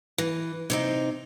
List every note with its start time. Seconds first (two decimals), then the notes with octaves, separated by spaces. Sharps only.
0.18 E3
0.70 C3 C4 D#4